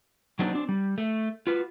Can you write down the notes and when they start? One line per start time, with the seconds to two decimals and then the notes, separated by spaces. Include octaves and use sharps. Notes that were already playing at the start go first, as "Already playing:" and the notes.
0.39 F#3 A#3 C4 D4 D#4 F#4
0.53 C4 D4
0.69 G3
0.98 A3
1.47 F4 F#4 B4